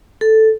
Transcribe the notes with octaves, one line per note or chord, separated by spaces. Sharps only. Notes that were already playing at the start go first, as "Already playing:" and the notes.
A4